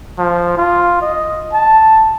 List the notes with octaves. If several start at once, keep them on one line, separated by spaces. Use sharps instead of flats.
F3
F4
D#5
A5